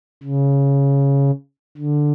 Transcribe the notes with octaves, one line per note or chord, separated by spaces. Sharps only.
C#3
D3